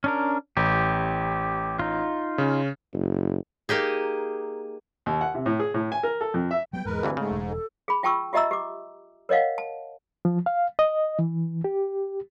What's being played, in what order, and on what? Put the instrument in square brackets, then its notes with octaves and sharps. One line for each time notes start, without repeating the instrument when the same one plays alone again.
[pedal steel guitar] C#4 D4 A#4
[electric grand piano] A1 [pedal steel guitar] G4
[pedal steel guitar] D#4 F4
[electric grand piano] C#3 C#4
[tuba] F#1
[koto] A#3 D#4 G4 G#4
[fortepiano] D#2
F#5
C3
A2
G#4
A2
G#5
A#4
A4
F2
E5
[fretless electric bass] F#3 G3 B3 [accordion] G5
[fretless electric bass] E2 G#2 [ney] G#3 [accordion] A#4 B4
[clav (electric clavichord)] D2 G2 E3 [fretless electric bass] C4
[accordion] G#2 [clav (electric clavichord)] C#3 [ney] A3
[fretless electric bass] E1
[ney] A4
[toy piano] G#4 B5
F4 G5 A5 C#6 E6
F4 G4 D#5 E5 A#5 E6
G4 D6
A#4 C#5 D#5 F5 F#5
A5
[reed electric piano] F3
F5
D#5
E3
G4